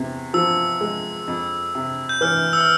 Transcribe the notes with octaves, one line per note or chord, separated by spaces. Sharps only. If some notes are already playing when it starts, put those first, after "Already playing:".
Already playing: E2 C3
F3 E6
G#3
F2
C3
G6
E3 F6
E6
F6